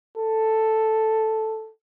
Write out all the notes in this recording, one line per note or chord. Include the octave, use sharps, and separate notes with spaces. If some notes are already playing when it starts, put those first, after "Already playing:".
A4